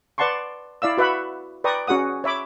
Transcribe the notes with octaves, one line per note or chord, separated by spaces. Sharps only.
B4 D5 F#5 A5 C6 C#6
E4 D5 F5 E6
F#4 B4 E5 F#5 B5
B4 D5 G5 A#5 C#6 D#6
C#4 F#4 G#4 F#5 D#6
C#5 E5 B5 D6